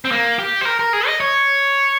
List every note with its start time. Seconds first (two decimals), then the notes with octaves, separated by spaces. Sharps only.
0.05 C4
0.11 A#3
0.39 G4
0.61 C5
0.65 A#4
0.79 A#4
0.93 G#4
1.07 D#5
1.20 C#5